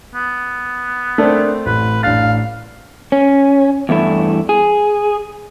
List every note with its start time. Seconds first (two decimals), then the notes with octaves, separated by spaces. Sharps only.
0.14 B3
1.18 A3 C4 D4 A#4 D5
1.66 A1 B4
2.03 A1 D4 F5 A6
3.12 C#4
3.89 E2 G2 A3 E4
4.49 G#4